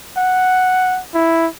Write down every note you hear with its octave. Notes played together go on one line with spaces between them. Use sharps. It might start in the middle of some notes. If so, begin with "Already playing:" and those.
F#5
E4